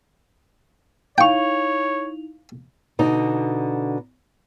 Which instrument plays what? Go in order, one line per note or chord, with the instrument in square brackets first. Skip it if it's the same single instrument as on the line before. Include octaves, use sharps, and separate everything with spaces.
[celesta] D#4 E4 F7 [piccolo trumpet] C#5 [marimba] F5 [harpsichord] G5 C#6
[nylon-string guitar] B2 D3 D#4